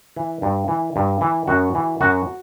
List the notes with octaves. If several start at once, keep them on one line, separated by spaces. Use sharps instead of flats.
E3
G2
E3
G2
E3
F#2 F#4
E3
F#2 F#4